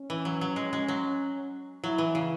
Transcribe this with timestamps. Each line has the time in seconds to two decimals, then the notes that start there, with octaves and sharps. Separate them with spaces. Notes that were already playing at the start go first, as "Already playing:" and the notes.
Already playing: C#4
0.10 E3
0.25 F#3
0.41 F#3
0.56 G#3
0.73 G#3
0.88 F#3
1.84 F#3 E4
1.98 E3
2.15 C#3